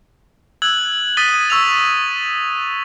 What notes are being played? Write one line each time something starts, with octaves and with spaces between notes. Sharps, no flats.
E6 F#6 G#6 F#7
D#6 A6 B6 D#7 F#7 G7
C#6 E6 A6 F7